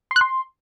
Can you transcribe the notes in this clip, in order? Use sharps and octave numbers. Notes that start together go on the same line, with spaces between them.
C6
F#6
C6